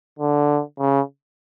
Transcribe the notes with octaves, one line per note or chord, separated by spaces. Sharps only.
D3
C#3